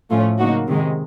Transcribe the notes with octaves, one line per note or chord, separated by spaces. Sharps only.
A2 F3 A3 C#4 F4
C#3 F#3 A#3 D#4 F#4
C3 D#3 G#3